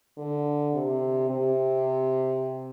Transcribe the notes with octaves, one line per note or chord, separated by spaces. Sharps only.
D3
C3
C3